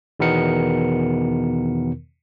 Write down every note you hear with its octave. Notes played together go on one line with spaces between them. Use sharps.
E2 B2 D#3 B3 A#4 C#7